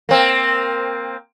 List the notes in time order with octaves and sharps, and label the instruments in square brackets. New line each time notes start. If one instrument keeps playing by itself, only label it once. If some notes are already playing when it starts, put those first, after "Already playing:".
[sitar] A#3 C4